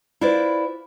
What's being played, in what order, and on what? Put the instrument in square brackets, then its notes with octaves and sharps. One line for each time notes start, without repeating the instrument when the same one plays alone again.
[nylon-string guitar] E4 F4 B4 C5 D5